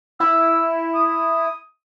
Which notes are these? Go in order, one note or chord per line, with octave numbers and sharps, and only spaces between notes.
E4 E6
D#6